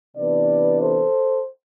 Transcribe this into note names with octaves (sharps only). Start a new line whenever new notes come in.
C3 E3 B3 D4 B4 D5
A4 C5